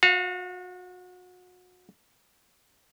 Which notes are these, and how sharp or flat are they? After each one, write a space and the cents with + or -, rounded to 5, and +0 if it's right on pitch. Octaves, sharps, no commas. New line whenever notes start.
F#4 -35 F5 +0